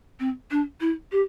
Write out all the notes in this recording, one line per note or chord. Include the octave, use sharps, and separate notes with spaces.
C4
D4
E4
G4